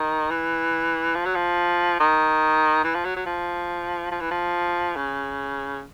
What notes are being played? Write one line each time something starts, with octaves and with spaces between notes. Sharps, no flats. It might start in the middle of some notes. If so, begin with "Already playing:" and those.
Already playing: D#3
E3
F3
F#3
F3
D#3
E3
F3
F#3
F#3
F3
F3
E3
F3
C#3